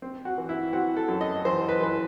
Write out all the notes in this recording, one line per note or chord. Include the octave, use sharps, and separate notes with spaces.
C4
F#4
E3
E4
C4 F#4
A4
F#2
D#5
E3 C5
B4
E3 B4